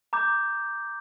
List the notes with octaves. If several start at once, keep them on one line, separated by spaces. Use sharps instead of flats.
A#5 D6 G6